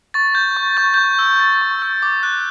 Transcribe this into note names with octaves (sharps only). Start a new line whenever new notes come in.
C#6 A6
G6
C#6
C#6 G6
C#6 G6
E6
G6 A6
C#6
E6
D6
F#6